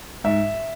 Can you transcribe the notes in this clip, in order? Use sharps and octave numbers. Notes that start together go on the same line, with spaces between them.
G#2 E5